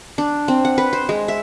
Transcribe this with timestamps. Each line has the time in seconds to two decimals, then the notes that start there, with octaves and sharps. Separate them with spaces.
0.18 D4
0.48 C4
0.65 F#5
0.78 B4
0.93 C5
1.09 G#3
1.28 E5